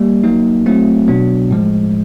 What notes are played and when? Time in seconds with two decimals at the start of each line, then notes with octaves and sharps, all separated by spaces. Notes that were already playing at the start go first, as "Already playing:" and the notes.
Already playing: G3 A#3
0.23 F#3 A#3 D#4
0.66 F#3 A3 C4 E4
1.08 B2 F#3 B3 D4
1.51 A2 F3 G#3